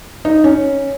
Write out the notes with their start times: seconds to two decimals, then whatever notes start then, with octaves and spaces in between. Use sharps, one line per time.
0.25 D#4
0.44 C#4